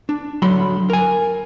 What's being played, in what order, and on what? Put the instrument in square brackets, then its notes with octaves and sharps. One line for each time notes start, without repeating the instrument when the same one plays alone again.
[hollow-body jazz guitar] D4
D3 F#3 B5 C6
A#4 G#5